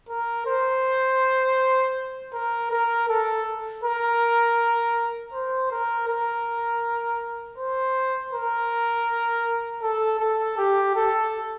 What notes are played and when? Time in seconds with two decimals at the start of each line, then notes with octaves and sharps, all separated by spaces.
0.09 A#4
0.47 C5
2.34 A#4
2.71 A#4
3.09 A4
3.84 A#4
5.33 C5
5.71 A#4
6.09 A#4
7.58 C5
8.33 A#4
9.83 A4
10.20 A4
10.58 G4
10.95 A4